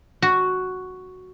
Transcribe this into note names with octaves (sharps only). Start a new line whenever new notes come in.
F#4